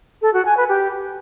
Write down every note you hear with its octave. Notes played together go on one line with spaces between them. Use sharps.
A4
F#4
G#5
B4
G4